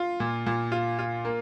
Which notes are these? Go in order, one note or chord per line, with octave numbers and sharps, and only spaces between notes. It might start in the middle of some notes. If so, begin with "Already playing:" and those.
Already playing: F4
A#2
A#2
F4
F4
A#3